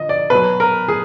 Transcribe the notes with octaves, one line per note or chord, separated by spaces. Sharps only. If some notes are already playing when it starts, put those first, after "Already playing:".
Already playing: D3 F3 D#5
D5
B2 F#3 B4
A#4
G#4